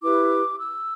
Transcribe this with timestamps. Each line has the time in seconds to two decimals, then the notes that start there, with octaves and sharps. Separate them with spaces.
0.02 E4 G4 B4 D6
0.59 E6